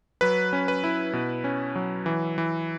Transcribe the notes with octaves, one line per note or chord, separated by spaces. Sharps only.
F#3 B4
C#4
B4
E4
B2
C#4
F#3
E3
E3